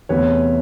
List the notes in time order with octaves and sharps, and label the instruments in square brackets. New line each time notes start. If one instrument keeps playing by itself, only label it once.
[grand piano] E2 C3 E3 A3 B4 C#5